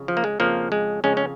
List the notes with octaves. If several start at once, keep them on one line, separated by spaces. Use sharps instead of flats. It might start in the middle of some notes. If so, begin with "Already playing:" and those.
Already playing: F2 C#3
F3
A#3
G#3
F2 C#3 F3 A#3
G#3
F2 C#3 G#3 C#4
C#4